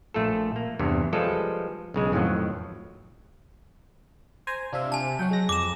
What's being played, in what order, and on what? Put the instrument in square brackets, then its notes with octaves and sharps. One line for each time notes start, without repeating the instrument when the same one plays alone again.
[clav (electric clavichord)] A#1 A3 F4 A4
A#3
E2 G2 C3 E3
F3 G3 G#3 F4 A4 B4
B1 C#3 G#3
F2 A2 D#3 F3 F#3
[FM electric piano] C5 G#5 A#5
[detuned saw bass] C3 [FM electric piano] D4 F4 E5
[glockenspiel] G#5 A5
[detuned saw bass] F#3 [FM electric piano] C#4 F#5 G5
[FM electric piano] G#3 A#6
[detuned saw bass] F2 [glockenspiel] D6 E7